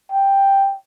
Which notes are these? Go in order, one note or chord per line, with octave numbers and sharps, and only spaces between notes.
G5